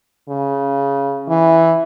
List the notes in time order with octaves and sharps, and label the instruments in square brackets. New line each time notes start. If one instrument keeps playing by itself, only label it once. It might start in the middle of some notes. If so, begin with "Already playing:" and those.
[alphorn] C#3
E3